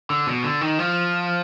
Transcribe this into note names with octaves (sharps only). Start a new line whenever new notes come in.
D3
B2
D3
D#3
F3